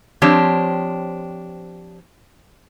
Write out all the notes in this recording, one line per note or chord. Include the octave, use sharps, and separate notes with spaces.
F3 C4 D4 G4 C#5